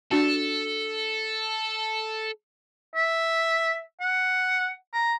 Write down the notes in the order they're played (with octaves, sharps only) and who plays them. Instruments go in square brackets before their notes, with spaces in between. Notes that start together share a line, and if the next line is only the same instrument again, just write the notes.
[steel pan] D4 F#4 A5 [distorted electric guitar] A4
[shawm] E5
F#5
A#5